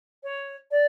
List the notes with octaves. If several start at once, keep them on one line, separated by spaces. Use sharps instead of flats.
C#5
D5